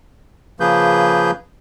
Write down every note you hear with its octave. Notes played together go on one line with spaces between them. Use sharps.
C#3 F3 A#3 G#4 B4 G6